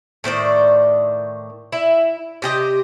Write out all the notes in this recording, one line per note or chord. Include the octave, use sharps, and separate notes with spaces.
A2 D#3 C5 D5
E4
C3 G4 D#5 G5